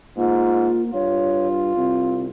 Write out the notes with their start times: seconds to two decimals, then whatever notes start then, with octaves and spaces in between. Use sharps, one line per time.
0.17 G#2 A#3 F4
0.94 G2 F4 C#5
1.77 C2 C4